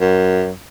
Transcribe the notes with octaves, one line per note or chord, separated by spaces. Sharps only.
F#2